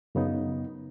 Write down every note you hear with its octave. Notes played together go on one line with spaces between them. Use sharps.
F#2 C#3 B3 D#4